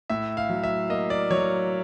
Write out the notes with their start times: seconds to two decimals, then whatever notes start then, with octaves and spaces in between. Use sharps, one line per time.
0.10 A2 E5
0.37 F5
0.49 F#3
0.63 E5
0.89 A#3 D#5
1.10 D5
1.31 F#3 C#5